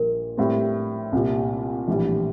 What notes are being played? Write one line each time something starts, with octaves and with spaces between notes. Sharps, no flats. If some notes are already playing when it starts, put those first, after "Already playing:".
Already playing: A#1 A#2 G3 A#4
A2 G3 C4
C2 A#2 G3
A#1 A2 E3 G3